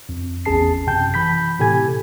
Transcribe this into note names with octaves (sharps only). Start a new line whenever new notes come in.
F2
A1 E2 C#4 G#4 A5 C7
F#2 C3 G5 A5 G6
E3 B5 G6 B6
A2 C3 G4 A4 G#5 G#6